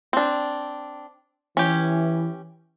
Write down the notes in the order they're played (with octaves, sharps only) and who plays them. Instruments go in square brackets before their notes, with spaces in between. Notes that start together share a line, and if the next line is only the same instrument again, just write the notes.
[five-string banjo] C4 D4
[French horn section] E3 [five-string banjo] C#4 G4